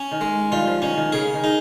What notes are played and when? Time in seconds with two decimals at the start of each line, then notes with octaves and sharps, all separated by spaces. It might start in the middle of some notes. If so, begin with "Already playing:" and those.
Already playing: C#4
0.11 D#3
0.21 G#3
0.51 D#3 G3 F4
0.67 F3
0.82 D#3 C#4
0.97 D#3
1.12 C#3 G#4
1.34 D#3
1.44 D#4